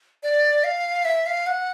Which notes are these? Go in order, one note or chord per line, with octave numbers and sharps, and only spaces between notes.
D5
F5
E5
F5
F#5